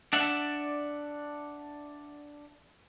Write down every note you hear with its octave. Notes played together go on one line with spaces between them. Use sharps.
D4 D5 E5 F#5